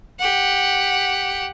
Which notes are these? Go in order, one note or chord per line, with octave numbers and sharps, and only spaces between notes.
G4 F#5